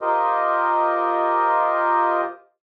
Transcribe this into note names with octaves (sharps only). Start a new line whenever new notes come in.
F4 G4 A#4 C5 D#5